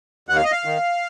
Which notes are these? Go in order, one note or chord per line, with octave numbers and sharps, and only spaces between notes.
D#2 F#5
F5
D#5
F5
D#3